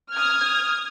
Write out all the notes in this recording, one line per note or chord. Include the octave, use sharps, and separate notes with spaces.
D#6 F6 G#6